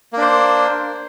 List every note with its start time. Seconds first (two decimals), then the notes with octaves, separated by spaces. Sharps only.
0.13 A#3
0.17 D4
0.22 C5